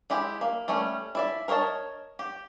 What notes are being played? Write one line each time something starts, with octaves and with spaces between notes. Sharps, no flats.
G#3 E4 G4
A#3
G3 A3 C#4 C#5
E4 D5 E5
A#4 C5 C#5 D#5 A5
G4